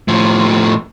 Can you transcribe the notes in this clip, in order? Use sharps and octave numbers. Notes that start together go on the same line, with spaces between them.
A2 F3